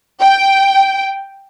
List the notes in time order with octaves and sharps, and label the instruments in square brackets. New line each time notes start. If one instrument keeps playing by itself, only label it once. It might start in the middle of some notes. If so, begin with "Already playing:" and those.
[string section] G5